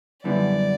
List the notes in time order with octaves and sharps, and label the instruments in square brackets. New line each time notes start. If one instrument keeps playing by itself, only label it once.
[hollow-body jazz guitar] F#2 D3 G3 B3 E4 [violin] D5